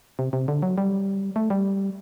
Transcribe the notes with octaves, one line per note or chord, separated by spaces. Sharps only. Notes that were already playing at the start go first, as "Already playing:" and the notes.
C3
C3
D3
F#3
G3
A3
G3